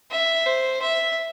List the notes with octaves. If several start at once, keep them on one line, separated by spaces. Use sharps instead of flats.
E5
C5
E5